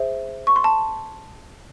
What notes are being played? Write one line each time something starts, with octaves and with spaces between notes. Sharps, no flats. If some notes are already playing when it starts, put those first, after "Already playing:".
Already playing: G#4 C5 E5
C#6
C6
A5